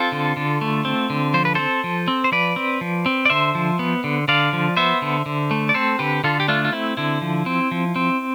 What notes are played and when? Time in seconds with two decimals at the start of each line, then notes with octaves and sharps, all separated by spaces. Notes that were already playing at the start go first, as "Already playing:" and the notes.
Already playing: C4 F4 A4
0.12 D3
0.37 D3
0.61 A3
0.85 C4
1.10 D3
1.34 F3 C5
1.45 B4
1.55 C4 A4 C5
1.84 F3
2.08 C4
2.24 C5
2.32 F3 B4 D5
2.56 C4
2.81 F3
3.06 C4
3.25 D5
3.30 D3 C5 E5
3.55 F3
3.79 B3
4.04 D3
4.28 D3 D5 F5
4.53 F3
4.77 B3 C5 E5
5.02 D3
5.26 D3
5.51 A3
5.69 D5
5.74 C4 A4 C5
5.99 D3 G4 B4
6.24 D3 F4 A4
6.40 G4
6.48 A3 D4 F4
6.65 F4
6.73 C4 E4
6.97 D3 E4
7.22 F3
7.46 C4
7.71 F3
7.96 C4